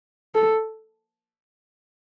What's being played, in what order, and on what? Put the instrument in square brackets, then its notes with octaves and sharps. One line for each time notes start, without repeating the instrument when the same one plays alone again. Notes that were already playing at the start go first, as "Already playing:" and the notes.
[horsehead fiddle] A4